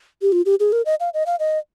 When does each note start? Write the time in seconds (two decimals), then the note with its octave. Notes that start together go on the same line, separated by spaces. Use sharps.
0.22 G4
0.32 F4
0.46 G4
0.60 G#4
0.72 A#4
0.86 D#5
1.00 F5
1.14 D#5
1.26 F5
1.40 D#5